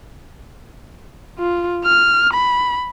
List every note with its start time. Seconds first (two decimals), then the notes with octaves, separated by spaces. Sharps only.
1.39 F4
1.85 F6
2.34 B5